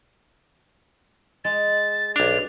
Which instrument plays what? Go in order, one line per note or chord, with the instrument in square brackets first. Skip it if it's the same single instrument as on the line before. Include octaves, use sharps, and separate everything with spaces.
[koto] G#3 [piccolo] A6
[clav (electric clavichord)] B1 D4 [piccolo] F7